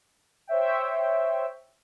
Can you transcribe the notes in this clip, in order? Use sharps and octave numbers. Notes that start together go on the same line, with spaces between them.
C5 C#5 E5 G5